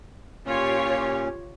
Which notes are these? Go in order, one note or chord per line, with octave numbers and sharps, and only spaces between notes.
A#2 C#4 F4 G4 C#5